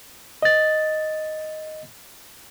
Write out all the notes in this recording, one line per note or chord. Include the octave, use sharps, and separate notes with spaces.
D#5 A6